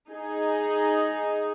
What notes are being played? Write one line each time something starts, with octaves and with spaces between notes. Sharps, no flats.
D#4 G#4